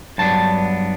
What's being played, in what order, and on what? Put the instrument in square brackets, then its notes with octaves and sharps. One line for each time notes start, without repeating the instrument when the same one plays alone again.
[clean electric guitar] G2 F#3 B3 D4 A5